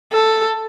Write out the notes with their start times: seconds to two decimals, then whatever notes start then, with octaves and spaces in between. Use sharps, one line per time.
0.13 A4